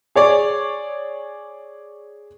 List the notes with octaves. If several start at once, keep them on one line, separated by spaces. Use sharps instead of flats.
G#4 C#5 D5